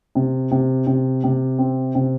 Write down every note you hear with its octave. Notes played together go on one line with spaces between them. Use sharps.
C3
C3
C3
C3
C4
C3